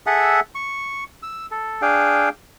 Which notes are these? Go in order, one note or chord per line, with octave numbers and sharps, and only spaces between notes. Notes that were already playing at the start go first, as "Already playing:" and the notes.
G#4 A4 E5 F#5
C#6
E6
A4
D4 G#4 F5 G5